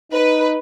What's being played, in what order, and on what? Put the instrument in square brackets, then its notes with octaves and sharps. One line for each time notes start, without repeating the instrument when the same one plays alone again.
[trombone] D#4 [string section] B4